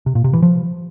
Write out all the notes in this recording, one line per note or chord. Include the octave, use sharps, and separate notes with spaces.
C3
A#2
C3
E3
F3